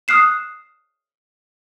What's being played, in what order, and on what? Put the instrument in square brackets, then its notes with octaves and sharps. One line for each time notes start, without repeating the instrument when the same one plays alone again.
[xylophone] D#6 F6 F#6 C7 E7